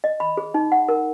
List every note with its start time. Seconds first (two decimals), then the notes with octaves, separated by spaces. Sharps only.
0.04 D#5
0.20 B5
0.37 G#4
0.54 D#4
0.72 F#5
0.89 A#4